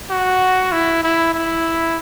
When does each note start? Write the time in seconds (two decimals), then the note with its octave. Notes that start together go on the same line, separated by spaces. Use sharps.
0.10 F#4
0.72 E4
1.03 E4
1.34 E4